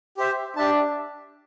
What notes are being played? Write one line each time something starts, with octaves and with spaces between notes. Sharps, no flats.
G4 C5 E5
D4 G4 E5 A5